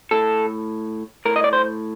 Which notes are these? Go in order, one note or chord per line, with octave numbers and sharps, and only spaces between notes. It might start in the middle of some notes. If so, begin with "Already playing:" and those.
A2 A4
A2 A#4
D#5
D5
C5